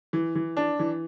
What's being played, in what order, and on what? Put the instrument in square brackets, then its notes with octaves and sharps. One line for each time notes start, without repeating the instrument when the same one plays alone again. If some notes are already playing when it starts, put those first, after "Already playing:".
[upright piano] E3
E3
D4
E3